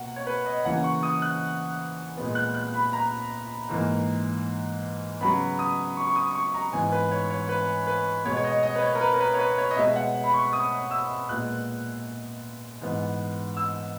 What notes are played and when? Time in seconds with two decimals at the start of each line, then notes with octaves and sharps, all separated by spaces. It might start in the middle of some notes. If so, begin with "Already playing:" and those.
Already playing: B2 A#3 F#5
0.16 C#5
0.27 B4
0.46 D#5
0.65 C#3 E3 A#3 F#5
0.84 C#6
1.03 D#6
1.22 F#6
2.17 A#2 G#3 B3
2.35 F#6
2.54 F#6
2.74 B5
2.93 A#5
3.69 G#2 E3 A#3
5.21 C#3 F#3 B3 B5
5.59 D#6
5.97 C#6
6.07 C#6
6.16 D#6
6.35 C#6
6.54 A#5
6.73 G#2 E3 B3 G#5
6.92 B4
7.11 C#5
7.30 C#5
7.49 B4
7.87 B4
8.25 B2 G#3 B3 C#5
8.37 C#5
8.44 D#5
8.63 D#5
8.76 B4
8.82 C#5
8.95 A#4
9.01 B4
9.14 A#4
9.20 B4
9.34 C#5
9.39 B4
9.58 C#5
9.71 D#5
9.77 B2 G#3 B3 E5
9.89 E5
9.96 F#5
10.24 B5
10.34 C#6
10.53 D#6
10.91 E6
11.29 A#2 G#3 B3 F#6
12.81 G#2 E3 B3
13.57 E6